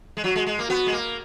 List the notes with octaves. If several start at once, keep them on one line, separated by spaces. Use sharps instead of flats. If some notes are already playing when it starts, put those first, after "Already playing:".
G#3
F#3 F#4
G#3
G#3
A#3
B3 F#4
G#3
A#3